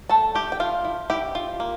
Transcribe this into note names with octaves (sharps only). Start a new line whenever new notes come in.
A3 A4 A5
A3 G4 G5
G5
E4 F4 F5
E4
E4 G4 G5
F4
A#3